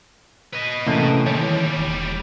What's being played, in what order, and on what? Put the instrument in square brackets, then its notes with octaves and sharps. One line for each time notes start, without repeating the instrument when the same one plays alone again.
[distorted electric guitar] B4 D#5
[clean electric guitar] A2 C3 [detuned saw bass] E3 [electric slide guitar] A#3 C#4 A4
[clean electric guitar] D#2 [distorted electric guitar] G3 G#3 [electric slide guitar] C#5
[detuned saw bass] E1